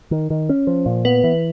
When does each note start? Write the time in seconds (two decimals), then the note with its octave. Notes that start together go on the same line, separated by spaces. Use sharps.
0.11 D#3
0.30 D#3
0.49 C#4
0.67 F3
0.86 A#2
1.05 B3 B4
1.24 E3